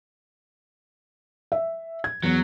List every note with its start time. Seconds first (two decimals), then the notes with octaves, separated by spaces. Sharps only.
1.52 E5
2.04 G#6
2.24 E2 F#3